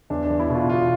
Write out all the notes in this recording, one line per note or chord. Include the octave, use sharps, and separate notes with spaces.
E2 D4
D4
E2
E4
B2 F4
B2 F4